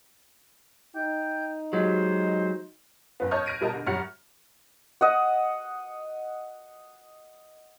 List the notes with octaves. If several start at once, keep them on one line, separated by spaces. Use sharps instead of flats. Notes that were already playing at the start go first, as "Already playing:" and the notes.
D#4 G5
F#3 G#3 C5
F#1 B3
C#5 D#5 A5 F6 G6
F6 G#6 A#6 D7 D#7
B2 G3 A#4 D#5 A5
D3
F#2 G3 C#5 F#5 F6 C#7
D#5 F#5